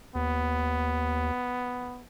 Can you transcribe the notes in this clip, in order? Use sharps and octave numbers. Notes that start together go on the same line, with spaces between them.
D#2 B3